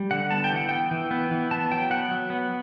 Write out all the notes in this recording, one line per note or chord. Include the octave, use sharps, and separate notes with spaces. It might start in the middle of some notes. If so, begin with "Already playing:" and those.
Already playing: G3
D3 F#5
B3 A5
G5
E3 F#5
B3 G5
E3
B3
E3
B3 A5
F#3 G5
B3 F#5
F#3
B3